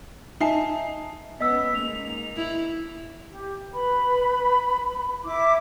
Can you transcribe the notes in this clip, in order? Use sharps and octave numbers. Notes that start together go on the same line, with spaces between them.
D#4 E5 G#5 A5 C7
B3 C#4 D#5 E6 B6
G#3 A#3 D#4 F7
E4
G4
B4 B5
E4 D6